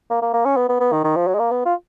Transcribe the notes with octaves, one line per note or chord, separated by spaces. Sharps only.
A#3
A#3
A#3
C#4
B3
B3
B3
D#3
D#3
F3
F#3
G#3
A#3
B3
F4